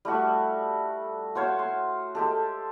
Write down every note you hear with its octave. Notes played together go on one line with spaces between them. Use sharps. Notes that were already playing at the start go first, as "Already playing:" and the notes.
G3 A3 F#4 E5
F#4 C5 C#5 F5
C6
G#3 G4 A4